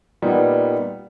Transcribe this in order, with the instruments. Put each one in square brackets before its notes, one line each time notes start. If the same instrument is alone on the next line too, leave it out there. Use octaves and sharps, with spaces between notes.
[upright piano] A#2 G3 B3 D#4